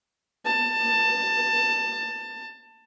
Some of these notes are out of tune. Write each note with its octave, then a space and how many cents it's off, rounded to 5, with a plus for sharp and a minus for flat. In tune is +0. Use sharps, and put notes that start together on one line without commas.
A5 +20